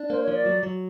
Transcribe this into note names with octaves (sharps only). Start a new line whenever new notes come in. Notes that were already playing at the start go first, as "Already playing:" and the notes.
Already playing: D4
A#3 C5
C#5
F3
D5
F#3
F#3